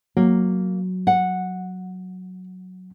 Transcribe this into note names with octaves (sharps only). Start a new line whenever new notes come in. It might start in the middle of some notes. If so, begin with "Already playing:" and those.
F#3 A#3
F#5